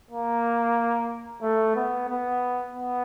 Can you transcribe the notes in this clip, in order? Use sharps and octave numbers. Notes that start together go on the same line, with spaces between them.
A#3
A3
B3
B3
B3